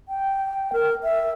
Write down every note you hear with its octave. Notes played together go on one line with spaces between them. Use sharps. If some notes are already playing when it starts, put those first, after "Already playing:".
G5
A#4
E5